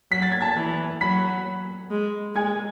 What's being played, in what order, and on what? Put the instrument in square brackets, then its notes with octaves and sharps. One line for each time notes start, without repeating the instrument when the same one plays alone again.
[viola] F#3 [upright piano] B6
[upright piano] A6
G#6
A5 A6
[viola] E3
[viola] F#3 [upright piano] B5 B6
[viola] G#3
[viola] G#3 [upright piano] G#5 G#6